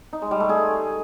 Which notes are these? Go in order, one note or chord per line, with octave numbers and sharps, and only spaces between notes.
D#4
G#3
G3
A3
G#4